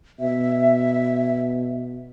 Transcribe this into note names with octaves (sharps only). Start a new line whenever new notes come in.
B2 E5